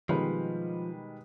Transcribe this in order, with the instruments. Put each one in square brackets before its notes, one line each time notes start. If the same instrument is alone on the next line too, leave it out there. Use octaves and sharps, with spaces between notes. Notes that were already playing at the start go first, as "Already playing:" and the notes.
[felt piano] B2 D#3 G3 [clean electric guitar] F3 [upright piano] G#3 B4